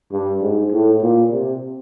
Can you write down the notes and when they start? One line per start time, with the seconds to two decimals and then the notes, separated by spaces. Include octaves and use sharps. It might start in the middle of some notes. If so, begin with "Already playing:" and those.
0.11 G2
0.42 G#2
0.72 A2
1.01 A#2
1.31 C3